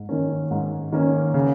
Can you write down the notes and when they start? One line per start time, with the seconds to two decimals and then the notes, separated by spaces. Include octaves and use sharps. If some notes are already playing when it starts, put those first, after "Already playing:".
Already playing: G#2
0.09 D#3 A#3 C#4
0.51 G#2
0.93 D#3 A#3 C#4
1.34 C#3